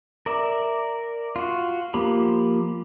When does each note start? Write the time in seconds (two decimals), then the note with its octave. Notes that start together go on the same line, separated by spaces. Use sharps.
0.26 A#4 D5 E5
1.36 F4 F#4
1.94 F3 A#3 G4 B5